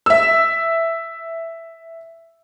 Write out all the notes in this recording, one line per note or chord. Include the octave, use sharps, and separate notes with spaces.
E5 E6